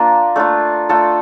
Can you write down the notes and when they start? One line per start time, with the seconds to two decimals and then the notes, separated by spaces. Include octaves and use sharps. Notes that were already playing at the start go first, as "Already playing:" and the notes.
Already playing: A#3 D4 F4 A#4
0.36 A3 D4 F4
0.89 A3 D4 F4 A4